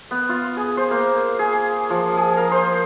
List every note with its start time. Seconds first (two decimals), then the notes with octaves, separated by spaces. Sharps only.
0.11 B3
0.29 F4
0.57 G#4
0.77 C5
0.91 A#3
1.39 G#4
1.90 F3
2.17 G#4
2.37 A#4
2.52 C5